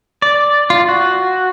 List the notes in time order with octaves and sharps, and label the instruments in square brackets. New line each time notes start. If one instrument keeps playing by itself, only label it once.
[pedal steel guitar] D5
F4
F#4